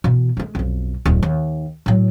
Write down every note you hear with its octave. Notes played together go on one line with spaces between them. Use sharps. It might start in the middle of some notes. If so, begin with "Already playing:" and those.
B2 E3
G#3 A3
B1 F2
D1 F2
D#2
A2 F#3